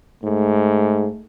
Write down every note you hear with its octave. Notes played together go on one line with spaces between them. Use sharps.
G#2 A3